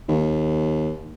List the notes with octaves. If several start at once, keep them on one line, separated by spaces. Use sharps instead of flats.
D#2